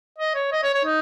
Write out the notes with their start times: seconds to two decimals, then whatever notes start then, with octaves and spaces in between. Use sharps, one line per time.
0.18 D#5
0.35 C#5
0.52 D#5
0.63 C#5
0.74 C#5
0.85 D#4